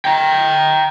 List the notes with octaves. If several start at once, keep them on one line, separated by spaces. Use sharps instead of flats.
G5 A#5